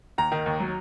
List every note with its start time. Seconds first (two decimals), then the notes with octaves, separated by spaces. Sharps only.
0.18 D#2 A#5
0.32 D#3
0.46 D#2
0.60 F#3